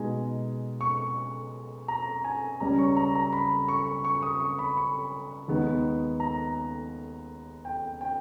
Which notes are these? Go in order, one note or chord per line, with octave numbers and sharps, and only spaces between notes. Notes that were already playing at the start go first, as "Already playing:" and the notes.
Already playing: B2 G#3 D#4 G#5
C#6
A#5
G#5
C#2 C#3 G3 C#4 A#5
C#6
A#5
A#5
B5
C#6
C#6
D#6
C#6
B5
C#6
D#2 D#3 G#3 B3 D#4
A#5
G5
G5